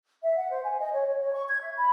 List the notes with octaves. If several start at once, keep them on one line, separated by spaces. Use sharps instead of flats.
E5
F#5
C5
G#5
D#5
C#5
C#5
C#5
C#6
G#6
E5
B5